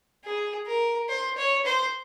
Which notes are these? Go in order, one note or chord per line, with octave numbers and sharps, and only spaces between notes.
G#4
A#4
C5
C#5
C5